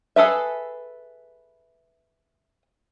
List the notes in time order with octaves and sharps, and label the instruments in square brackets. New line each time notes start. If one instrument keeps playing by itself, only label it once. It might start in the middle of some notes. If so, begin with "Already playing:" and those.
[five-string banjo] G#4 A4 B4 E5